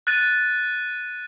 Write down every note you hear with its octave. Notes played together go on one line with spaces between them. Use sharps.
F#6 A6 D#7